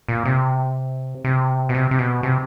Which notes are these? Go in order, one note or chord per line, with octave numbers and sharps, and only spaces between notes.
A#2
C3
C3
B2
C3
C3
B2
C3